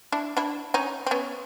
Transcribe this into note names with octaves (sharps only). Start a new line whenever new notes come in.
D4 E4
D4 E4
C#4 D#4
C4
B3 C#4